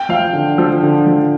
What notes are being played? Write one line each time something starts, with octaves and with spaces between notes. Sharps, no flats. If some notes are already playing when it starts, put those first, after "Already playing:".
Already playing: G5
F3 F5
D3
F3
D3
F3